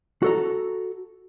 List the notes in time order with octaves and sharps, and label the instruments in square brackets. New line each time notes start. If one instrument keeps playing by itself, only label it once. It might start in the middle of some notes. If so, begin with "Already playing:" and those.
[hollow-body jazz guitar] F#4 A4 A#5